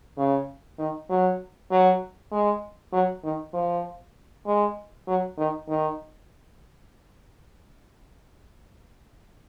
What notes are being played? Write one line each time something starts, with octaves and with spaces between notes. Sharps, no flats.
C#3
D#3
F#3
F#3
G#3
F#3
D#3
F3
G#3
F#3
D#3
D#3